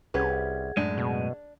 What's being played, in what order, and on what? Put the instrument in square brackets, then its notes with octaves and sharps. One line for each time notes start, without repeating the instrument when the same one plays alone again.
[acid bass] C2 [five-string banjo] C#4 G4 B4 [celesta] G#4 F#5 G#6
[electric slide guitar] F#2 A2 G#3 [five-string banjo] D4
[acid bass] B2